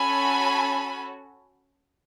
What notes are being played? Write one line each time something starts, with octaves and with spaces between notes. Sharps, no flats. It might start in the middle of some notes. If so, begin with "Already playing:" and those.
Already playing: C#4 F#4 A4 G#5 B5